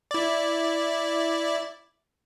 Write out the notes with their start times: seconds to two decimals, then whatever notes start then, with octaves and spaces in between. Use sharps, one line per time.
0.11 E4 D5